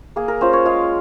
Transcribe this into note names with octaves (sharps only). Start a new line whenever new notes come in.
A#3 G#4
A#4
C#4 F4 C5
C#5
G#3 F5